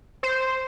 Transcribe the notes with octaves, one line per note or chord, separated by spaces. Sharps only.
C5